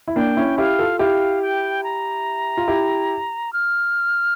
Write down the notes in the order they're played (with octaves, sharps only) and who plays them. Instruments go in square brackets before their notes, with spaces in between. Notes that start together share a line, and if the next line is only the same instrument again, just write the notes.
[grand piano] E4
[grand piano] A#3 D4 [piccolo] G5
[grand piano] C#4 E4
[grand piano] E4 G4 [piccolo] F5
[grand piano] F4 A4
[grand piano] E4 G4 [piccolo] F5
[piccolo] G5
A#5
[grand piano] F4
E4 G4
[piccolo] F6